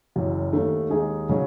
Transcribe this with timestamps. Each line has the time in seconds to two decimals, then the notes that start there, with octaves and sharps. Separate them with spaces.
0.16 F#1 F#2 E3
0.53 D#2 D#3 A3
0.90 D#2 D#3 G#3 D#4 G#4
1.29 C#3 F#3